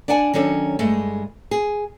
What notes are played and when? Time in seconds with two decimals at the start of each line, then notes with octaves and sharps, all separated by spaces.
0.08 D4 D5 F#5 G#5 A5
0.34 D#3 F#3 C#4 D4 A4
0.79 G2 G#3 A3
1.51 G#4